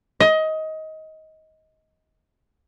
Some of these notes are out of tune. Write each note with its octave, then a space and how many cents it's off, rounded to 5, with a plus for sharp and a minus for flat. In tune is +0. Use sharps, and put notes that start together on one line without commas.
D#5 +20